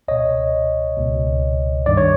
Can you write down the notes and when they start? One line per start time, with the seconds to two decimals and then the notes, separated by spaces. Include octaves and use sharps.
0.08 C#2 B2 C#5 D#5
0.97 C#2 B2
1.86 G2 D#3 D5
1.97 C#5